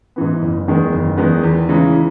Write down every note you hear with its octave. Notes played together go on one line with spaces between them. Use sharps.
G#2 E3 B3
F#1
E2 D#3 G#3 B3
F#1
E2 D#3 G#3 B3
E2
C#3 E3 G#3 D#4